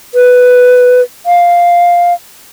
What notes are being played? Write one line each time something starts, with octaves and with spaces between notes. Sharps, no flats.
B4
F5